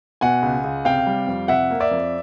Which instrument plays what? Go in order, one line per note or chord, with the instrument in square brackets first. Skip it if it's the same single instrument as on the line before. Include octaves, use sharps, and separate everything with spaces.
[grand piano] B2 F#5 G#5
C#2
C#2
C3 F5 G5
G3
F2
C3 E5 F#5
A#3
D5 E5
F2